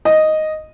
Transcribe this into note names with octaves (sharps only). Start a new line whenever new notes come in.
D#5